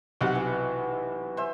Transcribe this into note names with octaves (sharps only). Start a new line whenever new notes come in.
B1 C3 F#4 F#5
E3
C5 E5 G#5